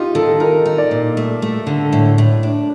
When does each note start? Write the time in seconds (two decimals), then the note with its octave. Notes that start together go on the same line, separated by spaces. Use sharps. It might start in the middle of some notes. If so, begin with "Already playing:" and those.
Already playing: D#4 F4 G4
0.15 D#3 A4
0.40 D#4 A#4
0.66 D#4
0.78 D5
0.91 A#2
1.17 A3
1.42 A3
1.67 D3
1.93 A2
2.18 A2
2.43 D4